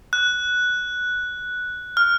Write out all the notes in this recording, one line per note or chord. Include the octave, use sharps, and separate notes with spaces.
F#6
F6